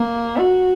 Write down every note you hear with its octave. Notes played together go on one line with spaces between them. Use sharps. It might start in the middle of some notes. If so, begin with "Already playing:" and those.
Already playing: A#3
F#4